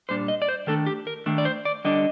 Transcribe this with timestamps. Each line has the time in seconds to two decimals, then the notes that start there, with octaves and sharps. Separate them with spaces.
0.09 A#2 G3 D4 C5
0.28 D#5
0.42 D5
0.49 C5
0.67 D#3 A3 D4 A4
0.86 G4
1.07 A#4
1.26 D#3 A3 D4
1.38 D5
1.45 C5
1.65 D5
1.84 D3 G3 D4 D#5